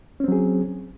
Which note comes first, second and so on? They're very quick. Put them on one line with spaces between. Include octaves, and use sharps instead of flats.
C#4 C4 F#3 G#4